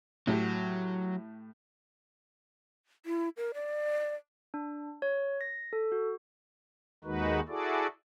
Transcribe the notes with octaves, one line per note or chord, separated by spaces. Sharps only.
A2 F#3 G4
E4
A#4
D5
D4
C#5
A#6
A4
F#4
D#2 D#3 G#3 D#4 F#4 B4
E4 F#4 G#4 A4 D5